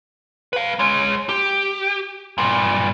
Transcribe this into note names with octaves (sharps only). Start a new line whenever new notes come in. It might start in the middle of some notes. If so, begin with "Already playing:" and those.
B4 F5
G#3 C#5
G4
G2 A#2